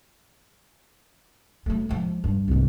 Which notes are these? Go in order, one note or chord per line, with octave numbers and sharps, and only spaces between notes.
F#3 A3
F3 G#3
G2
C2 G#2